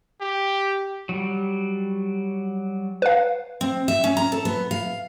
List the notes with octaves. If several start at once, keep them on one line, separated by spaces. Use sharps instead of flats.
G4
F#3 G3
B4 F5
C4
E5
C#4
A#5
A4
B3
F5